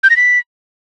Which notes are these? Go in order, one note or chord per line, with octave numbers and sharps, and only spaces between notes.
G6
A#6
B6